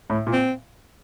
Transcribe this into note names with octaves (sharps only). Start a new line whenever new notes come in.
A2
A#2
C4